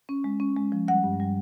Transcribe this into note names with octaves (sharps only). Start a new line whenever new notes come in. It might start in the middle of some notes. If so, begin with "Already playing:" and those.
C#4
G#3
C#4
G#3
F3
G3 F#5
G2
G3